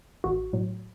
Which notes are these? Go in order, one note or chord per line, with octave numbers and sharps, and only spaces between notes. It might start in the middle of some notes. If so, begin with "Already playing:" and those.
A1 F#4
A2 F#3